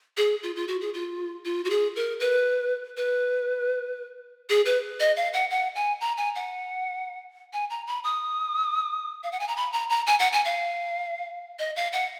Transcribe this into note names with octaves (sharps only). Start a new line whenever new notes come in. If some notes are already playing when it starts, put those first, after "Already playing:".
G#4
F4
F4
F#4
G#4
F4
F4
F#4
G#4
A#4
B4
B4
G#4
B4
D#5
F5
F#5
F#5
G#5
A#5
G#5
F#5
G#5
A#5
B5
D#6
F5
F#5
G#5
A#5
B5
A#5
A#5
G#5
F#5
G#5
F5
D#5
F5
F#5